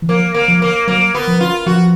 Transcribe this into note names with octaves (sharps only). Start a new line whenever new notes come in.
E3
F3 A#3
A#3
F3
A#3
F#3 A#3
B3
F3
F4
F3 F#4